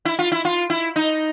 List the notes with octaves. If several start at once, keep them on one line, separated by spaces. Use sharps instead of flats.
E4
F4
E4
F4
E4
D#4